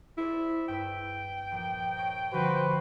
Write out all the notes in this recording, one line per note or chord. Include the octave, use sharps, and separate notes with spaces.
E4 G#4 C5 D5
G2 B4 G5 E6
A#1
C#5 D#5
D3 F3 G3 F#4 B4 C5